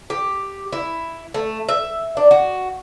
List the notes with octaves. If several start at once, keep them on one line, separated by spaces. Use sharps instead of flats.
G4
E4
A3
E5
D4
F#4